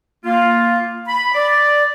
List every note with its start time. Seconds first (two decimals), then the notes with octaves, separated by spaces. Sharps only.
0.25 A#3 F4
1.08 B5
1.34 D5